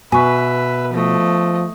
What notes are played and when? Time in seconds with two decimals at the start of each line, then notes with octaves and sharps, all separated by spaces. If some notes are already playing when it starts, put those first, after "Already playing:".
0.12 B2 B4 E5 G#5 C#6
0.93 F3 A3 D#5